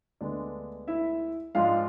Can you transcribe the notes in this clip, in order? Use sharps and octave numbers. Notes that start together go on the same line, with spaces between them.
D2 D3 G#3 B3 D4 D5
E4 E5
G#2 F3 G#3 D4 F4 F5